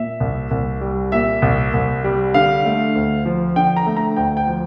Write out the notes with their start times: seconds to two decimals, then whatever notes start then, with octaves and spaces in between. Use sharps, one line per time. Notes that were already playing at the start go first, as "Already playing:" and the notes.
Already playing: A#2 E5
0.20 C2
0.51 C2
0.81 G3
1.12 A#2 E5
1.42 C2
1.74 C2
2.04 G3
2.34 D3 F5
2.65 A3
2.95 D2
3.26 F3
3.56 D3 G5
3.77 A#5
3.86 A3
3.97 A#5
4.16 D2 G5
4.37 G5
4.47 F3